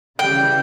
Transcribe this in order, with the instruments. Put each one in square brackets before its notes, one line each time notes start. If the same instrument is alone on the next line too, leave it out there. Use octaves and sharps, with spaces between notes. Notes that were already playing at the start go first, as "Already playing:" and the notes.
[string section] C#3 E3 G3 [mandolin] G5